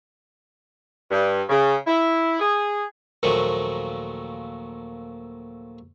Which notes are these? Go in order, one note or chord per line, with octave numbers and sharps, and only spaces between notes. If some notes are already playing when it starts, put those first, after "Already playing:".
G2
C#3
E4
G#4
D#2 A#2 F3 F#3 A3